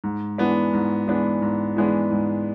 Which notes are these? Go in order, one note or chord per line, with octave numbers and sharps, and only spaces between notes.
G#2
E3 G#3 B3 D4
G#2
E3 G#3 B3 D4
G#2
E3 G#3 B3 D4
G#2